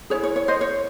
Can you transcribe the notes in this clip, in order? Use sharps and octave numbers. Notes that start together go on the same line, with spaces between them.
E4 G#4 C#5
C#5
C#5
C5 D#5
C#5